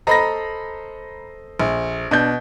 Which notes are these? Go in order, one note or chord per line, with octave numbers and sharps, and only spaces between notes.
A4 C5 D#5 A#5 B5 A#6
A#1
B2 D4 G6